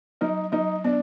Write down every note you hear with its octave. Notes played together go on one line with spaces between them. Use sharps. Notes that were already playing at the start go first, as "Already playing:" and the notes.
F#3 D#4
F#3 D#4
B3 D4